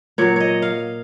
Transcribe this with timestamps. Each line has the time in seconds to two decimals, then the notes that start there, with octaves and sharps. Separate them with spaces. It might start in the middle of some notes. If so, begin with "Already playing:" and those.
0.18 A#2 F#3 C#5
0.36 C#5 D#5
0.62 F5